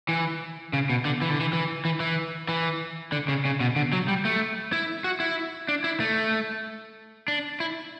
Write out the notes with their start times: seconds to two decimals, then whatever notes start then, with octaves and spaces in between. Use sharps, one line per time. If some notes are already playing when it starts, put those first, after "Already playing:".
0.09 E3
0.73 C#3
0.90 B2
1.05 D3
1.22 E3
1.30 D3
1.40 E3
1.53 E3
1.85 E3
2.00 E3
2.49 E3
3.12 D3
3.28 C#3
3.45 C#3
3.60 B2
3.76 D3
3.93 F#3
4.08 G3
4.25 A3
4.73 E4
5.04 F#4
5.20 E4
5.69 D4
5.84 E4
6.00 A3
7.28 D4
7.60 E4